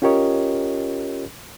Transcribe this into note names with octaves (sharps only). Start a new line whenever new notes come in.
C#4 F4 G4 A#4 C#5 D#5